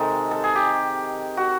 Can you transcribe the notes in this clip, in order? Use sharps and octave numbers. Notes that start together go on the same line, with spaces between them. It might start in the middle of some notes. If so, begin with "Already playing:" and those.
Already playing: C3 D#3 G#3 A4
A4
G#4
G4
F#4